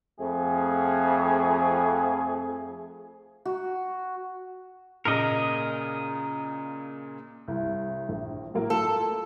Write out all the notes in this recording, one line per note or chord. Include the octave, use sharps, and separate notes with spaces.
F2 F3 A3 G#4
F#4
A#2 C#3 A#4 D#5
C2
A#1
A2 F#3 A#3
A#3 F4 A4